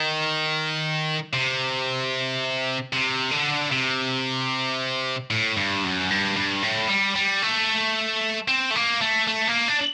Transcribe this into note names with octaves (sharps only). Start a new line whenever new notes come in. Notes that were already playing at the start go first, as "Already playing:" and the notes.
Already playing: D#3
C3
C3
D3
C3
A2
G2
F#2
G2
G2
A2
G3
G3
A3
C4
A3
A#3
A3
A3
A#3
D4